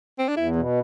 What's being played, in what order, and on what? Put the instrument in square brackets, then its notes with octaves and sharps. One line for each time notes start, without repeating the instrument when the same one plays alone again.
[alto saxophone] C4
D4
[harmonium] E2 [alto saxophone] E4
[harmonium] B2